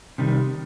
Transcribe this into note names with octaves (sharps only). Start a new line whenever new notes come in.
C3 D#3 G3